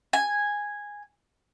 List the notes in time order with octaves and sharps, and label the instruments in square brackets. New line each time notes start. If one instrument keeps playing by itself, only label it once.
[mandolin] G#5